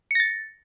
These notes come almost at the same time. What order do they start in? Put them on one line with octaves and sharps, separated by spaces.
C#7 A#6 A6